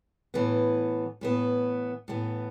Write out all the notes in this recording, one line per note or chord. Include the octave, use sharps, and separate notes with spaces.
A2 E3 B3
A2 E3 B3
A2 E3 B3